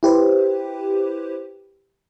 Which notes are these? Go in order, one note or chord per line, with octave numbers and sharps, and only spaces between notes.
E4 G4 B4 C5